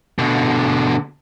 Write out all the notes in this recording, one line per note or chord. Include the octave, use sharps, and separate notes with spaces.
B2 D3